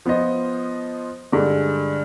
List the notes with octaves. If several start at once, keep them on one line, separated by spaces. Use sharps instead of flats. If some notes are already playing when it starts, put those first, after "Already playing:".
F3 B3 F4 C5 D#5
G2 D3 G#3